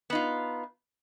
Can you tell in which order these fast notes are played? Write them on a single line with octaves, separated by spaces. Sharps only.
B3 D#4 F4